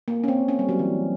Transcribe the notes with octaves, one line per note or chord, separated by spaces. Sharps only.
A#3
C#4
C4
C#4
G3
F#3
E3